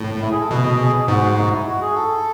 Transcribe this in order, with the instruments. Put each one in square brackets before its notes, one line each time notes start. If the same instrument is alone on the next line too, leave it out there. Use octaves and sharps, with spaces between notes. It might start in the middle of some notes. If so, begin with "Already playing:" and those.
Already playing: [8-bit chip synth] A2
[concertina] E4
G#4
A4
[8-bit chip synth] B2 [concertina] B4
[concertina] D#5
G#4
[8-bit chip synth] G#2 [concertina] F#4
[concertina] D#4
E4
F#4
G#4
A4